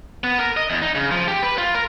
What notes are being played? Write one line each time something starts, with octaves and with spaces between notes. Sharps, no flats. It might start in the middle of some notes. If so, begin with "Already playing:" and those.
B3
A#4
D#5
E2
D#4
C#3
F3
G4
B4
F4
A#4